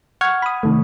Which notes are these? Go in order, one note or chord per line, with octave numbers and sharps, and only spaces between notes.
F#5 C#6 F6 G#6
B5 D#6
C3 D#3 A3